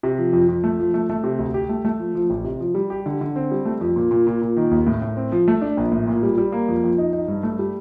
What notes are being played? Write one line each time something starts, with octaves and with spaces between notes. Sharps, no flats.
C3
F3
F2
F2
A3
F3
A3
A3
C3
D2
G4
A3
A3
F3
F3
A1
C3
F3
G3
G4
D3
D3
C4
G3
A3
F2
A#2
A#2
A#2
A#2
D#3
D#2
A2
A2
C4
F3
A3
D4
A#1
A2
A#2
G3
G3
A#3
F2
F2
D#4
D#4
G2
A3
G3